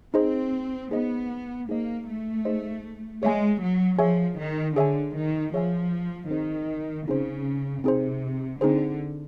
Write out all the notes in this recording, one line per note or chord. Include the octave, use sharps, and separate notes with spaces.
C4 D#4 G#4 C5 D#5
B3 D#4 G#4 C5 D#5
A#3 D#4 G#4 C5 D#5
A3
D#4 G#4 C5 D#5
G#3 G#4 C#5 E5 G#5
F#3
F3 G#4 C#5 E5 G#5
D#3
D3 G#4 C#5 E5 G#5
D#3
F3 G#4 C#5 E5 G#5
D#3 C4 D#4 G#4 C5
C#3 C4 D#4 G#4 C5
C3 C4 D#4 G#4 C5
D3 C4 D#4 G#4 C5